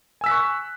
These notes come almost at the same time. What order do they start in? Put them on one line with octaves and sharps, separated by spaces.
G#5 E6 B6 F#6 C#6